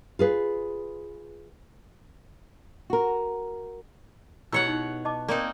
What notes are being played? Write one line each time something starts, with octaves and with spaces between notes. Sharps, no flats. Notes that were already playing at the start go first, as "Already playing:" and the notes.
F4 G#4 B4
F#4 A#4
B2 E4 G4 C#5 F#5 E6
D#4
D#5 A5 D6
A#3 C4 D#4 D5